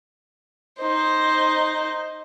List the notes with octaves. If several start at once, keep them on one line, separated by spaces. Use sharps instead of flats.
D#4 C5